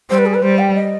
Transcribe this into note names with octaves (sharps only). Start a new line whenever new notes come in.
G3 C5
B4
G#4
B4
G3 C5
G5
D#5